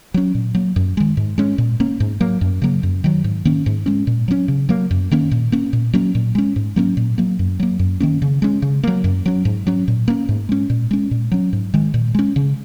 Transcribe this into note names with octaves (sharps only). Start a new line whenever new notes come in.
F#3 C#4
A#2
F#3 A#3
F#2
D#3 G#3
G#2
G#3 C#4
A#2
A#3 C#4
G#2
F#3 A#3
F#2
C#3 F#3 A#3
F#2
D#3 F#3
G#2
D#3 A#3 C#4
G#2
G#3 C#4
A#2
F#3 A#3 C#4
C#3
F#3 A#3
F#2
D#3 A#3 C#4
A#2
A#3 C#4
A#2
F#3 A#3 C#4
A#2
G#3 C#4
G#2
F#3 A#3 C#4
A#2
F#3 A#3
F#2
F#3 A#3
F#2
D#3 A#3 C#4
C#3
G#3 C#4
C#3
F#3 A#3
F#2
F#3 C#4
G#2
F#3 C#4
A#2
A#3 C#4
G#2
G#3 C#4
A#2
G#3 C#4
A#2
F#3 C#4
G#2
D#3 G#3
A#2
G#3 C#4
C#3